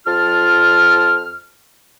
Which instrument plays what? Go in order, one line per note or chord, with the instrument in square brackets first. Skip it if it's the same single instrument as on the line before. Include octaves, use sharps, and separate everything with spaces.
[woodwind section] F2 F4 A5 F6